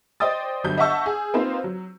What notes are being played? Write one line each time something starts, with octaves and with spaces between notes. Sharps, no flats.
C5 D5 D#5 G5 D#6 A6
G1 F#3 G6
D#5 E5 F#5 A5 C#6 E6
G#4
A#3 C4 D#4 F4 B4 C5
F#3